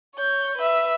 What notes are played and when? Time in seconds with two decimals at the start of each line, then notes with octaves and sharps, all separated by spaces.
0.15 C#5 G6
0.57 B4 E5